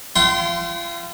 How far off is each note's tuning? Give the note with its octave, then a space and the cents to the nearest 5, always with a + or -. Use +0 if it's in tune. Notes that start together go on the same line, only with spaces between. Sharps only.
F4 -35 G5 -40 C6 -15